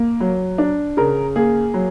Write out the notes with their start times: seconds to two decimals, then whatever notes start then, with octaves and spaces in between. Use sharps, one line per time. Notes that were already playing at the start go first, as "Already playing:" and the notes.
Already playing: A#3
0.20 F#3
0.58 D4
0.97 C#3 A#4
1.36 A#3 G#4
1.74 F#3